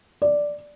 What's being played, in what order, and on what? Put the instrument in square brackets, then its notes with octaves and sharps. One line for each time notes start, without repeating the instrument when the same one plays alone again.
[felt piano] D5